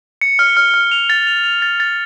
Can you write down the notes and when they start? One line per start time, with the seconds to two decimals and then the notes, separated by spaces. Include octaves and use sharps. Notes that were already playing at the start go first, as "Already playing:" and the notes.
0.21 C#7
0.39 F6
0.57 F6
0.74 F6
0.91 F7
1.10 A6
1.27 F7
1.44 F7
1.62 A6
1.80 A6